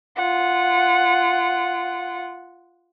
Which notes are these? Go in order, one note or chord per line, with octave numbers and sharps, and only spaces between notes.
F4 F#5